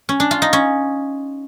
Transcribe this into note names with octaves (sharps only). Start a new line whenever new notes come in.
C#4
D4
F4
D#4
C#4